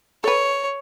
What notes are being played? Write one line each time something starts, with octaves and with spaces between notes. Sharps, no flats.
A4 B4 C#5